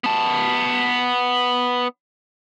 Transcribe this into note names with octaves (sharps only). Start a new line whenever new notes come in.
B3 A5